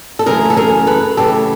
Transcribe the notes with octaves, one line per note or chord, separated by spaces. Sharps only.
A4
F#2 C#3 E3 A3 G#4 A#4
A4
G#4 A#4
A4 B4
F#2 C#3 E3 A3 G4 A4